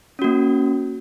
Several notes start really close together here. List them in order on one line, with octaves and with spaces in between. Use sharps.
C#4 F#4 A#3